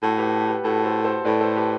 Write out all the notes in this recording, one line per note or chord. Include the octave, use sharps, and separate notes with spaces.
A2 F#4 A4
G4 B4
G4 B4
A2 F#4 A4
A4 C5
A4 C5
A2 B4 D5
A4 C5
G4 B4